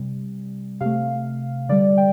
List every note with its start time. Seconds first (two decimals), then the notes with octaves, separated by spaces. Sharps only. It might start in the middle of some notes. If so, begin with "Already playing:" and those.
Already playing: C3 G3
0.80 C3 A3 F5
1.69 D3 G3 D5
1.97 G5